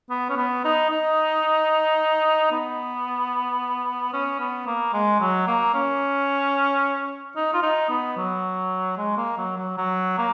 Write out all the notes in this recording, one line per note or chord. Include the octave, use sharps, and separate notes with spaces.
B3
C#4
B3
D#4
D#4
B3
C#4
B3
A#3
G#3
F#3
A#3
C#4
D#4
F4
D#4
B3
F#3
G#3
A#3
F#3
F#3
F#3
A#3